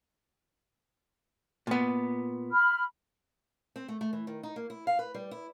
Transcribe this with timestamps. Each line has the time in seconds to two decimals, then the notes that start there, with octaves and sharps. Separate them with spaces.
1.67 A#2 B3
2.52 B5 F6
3.76 C4
3.88 A3
4.01 A3
4.13 E3
4.27 D#3
4.43 D#4
4.56 A#3
4.70 E4
4.87 F5
4.99 B4
5.14 G3
5.31 E4